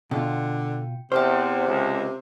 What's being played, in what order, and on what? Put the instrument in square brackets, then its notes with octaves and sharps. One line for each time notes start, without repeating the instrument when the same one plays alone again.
[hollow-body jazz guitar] B2 F4 [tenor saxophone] D3 [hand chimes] G5
[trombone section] E2 [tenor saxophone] C3 [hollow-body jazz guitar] C5 [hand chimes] G5 C6 F6
[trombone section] C#2